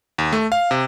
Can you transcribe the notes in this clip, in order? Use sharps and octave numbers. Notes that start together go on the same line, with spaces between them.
D#2
A3
F5
C3